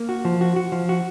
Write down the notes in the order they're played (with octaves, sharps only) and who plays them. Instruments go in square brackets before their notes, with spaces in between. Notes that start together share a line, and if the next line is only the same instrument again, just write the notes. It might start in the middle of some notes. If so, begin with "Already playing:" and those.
Already playing: [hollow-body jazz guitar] A#3
F#4
F3
F#4
F#4
F3
F#4